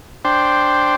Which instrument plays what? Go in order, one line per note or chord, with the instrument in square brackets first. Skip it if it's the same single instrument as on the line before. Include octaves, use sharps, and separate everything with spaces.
[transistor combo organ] D4 C5 G5